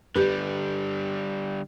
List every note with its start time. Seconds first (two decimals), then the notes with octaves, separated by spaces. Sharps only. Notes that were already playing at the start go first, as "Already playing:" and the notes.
0.16 D3 G3 G4 B4